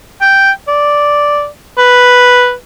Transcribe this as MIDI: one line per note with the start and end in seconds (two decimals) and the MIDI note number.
0.22 0.51 79
0.68 1.48 74
1.78 2.54 71